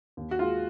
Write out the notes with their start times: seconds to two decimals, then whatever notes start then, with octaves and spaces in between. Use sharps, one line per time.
0.17 D#2
0.31 F#4
0.39 G#3 F4